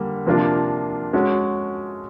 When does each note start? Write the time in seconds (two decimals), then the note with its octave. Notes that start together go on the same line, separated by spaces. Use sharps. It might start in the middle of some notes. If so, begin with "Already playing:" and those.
Already playing: D3 G3 A#3
0.26 C3 F3 A#3 D4 F4
1.13 G#3 C#4 F#4 A4